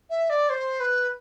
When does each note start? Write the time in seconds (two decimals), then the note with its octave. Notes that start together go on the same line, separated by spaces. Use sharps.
0.10 E5
0.30 D5
0.50 C5
0.80 B4